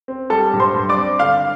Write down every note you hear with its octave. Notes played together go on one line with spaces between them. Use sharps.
C4
G3 A4 A5
G2
C5 C6
G2
D5 D6
C4
D3 F5 F6